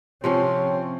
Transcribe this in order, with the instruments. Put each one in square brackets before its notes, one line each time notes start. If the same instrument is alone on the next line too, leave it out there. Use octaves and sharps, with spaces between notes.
[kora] C3 F3 C#4 [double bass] C4 [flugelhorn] C#5